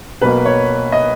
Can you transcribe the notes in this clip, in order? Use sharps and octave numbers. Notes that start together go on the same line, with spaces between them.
B1 B2 A#3 B4
C#5
D#5